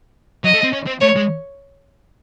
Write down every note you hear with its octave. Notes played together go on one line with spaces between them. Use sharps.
F#3 D#5
A3
C4
C#4
C4
A3 C#5
G#3